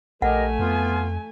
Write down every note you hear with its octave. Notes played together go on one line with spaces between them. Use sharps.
A#1 A3 G4 A#4 D#5 F#5 G#5
F2 B3 F4